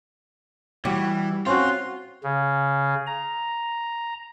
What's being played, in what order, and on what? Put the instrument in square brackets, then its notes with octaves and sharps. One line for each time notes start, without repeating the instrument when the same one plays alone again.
[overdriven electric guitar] E3 [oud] G3 F#4
[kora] C4 C#4 F#4 [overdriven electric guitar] F4
[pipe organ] C#3
A#5